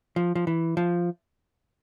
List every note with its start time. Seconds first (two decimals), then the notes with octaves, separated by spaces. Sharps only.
0.16 F3
0.35 F3
0.47 E3
0.77 F3